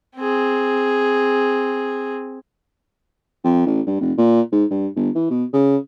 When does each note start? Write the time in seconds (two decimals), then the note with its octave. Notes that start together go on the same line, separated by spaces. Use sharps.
0.17 C4 G#4
3.44 F2
3.66 A1
3.86 G2
4.00 F1
4.18 A#2
4.52 G#2
4.71 G2
4.96 G1
5.15 E3
5.30 B2
5.53 C#3